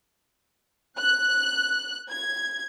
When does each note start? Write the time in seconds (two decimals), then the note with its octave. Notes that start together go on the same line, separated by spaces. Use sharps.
0.97 F#6
2.10 G#6